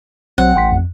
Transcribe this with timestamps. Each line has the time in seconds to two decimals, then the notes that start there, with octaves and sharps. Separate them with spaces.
0.38 B1 F#3 C4 F#5
0.56 A1 G5 C6 B6
0.72 F2